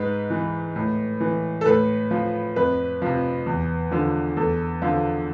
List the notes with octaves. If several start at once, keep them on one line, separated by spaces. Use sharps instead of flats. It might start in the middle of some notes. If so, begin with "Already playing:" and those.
Already playing: G#2 B4
E3
A2
E3
A4
A2 B4
F3
F2 B4
C3 F3
E2
D3 F3
E2 A4
D3 F3